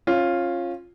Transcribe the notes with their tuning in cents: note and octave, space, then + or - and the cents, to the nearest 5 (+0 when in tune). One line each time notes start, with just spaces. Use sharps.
C#4 -25 F4 +0